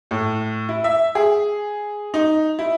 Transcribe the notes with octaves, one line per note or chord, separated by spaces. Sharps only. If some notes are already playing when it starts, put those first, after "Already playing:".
A2
E4
E5
G#4
D#4
E4